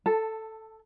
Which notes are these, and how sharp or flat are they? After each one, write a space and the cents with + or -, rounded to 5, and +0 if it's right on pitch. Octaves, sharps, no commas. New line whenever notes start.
A4 +0 A5 +20